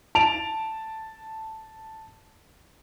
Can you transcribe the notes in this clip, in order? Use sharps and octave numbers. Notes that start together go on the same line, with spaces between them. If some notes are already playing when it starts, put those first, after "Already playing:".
A5 D7 F7